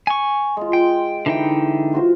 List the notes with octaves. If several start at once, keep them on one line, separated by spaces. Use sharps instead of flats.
G#5 C#6
G#3 F4
G5
D3 E3 D#4 G5
F4 F#4 C5